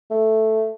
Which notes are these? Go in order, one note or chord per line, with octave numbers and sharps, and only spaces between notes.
A3